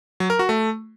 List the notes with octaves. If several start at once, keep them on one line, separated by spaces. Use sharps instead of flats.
F#3
A#4
F#4
A3